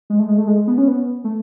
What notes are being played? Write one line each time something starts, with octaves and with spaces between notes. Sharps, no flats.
G#3
A3
G#3
A3
G#3
B3
C#4
B3
A3